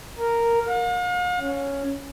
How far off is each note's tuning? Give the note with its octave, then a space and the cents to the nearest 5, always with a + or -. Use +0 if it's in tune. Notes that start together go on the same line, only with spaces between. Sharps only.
A#4 -5
F5 +45
C#4 +0